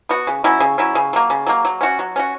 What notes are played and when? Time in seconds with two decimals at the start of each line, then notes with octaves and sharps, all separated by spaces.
0.09 B3 F#4
0.27 C#3
0.44 F#3 C#4 E4
0.60 C#3
0.78 F#3 C#4 E4
0.95 C#3
1.13 F#3 A#3
1.30 C#3
1.47 F#3 A#3
1.65 F#3
1.81 C#4 F#4
1.99 F#3
2.16 C#4 F#4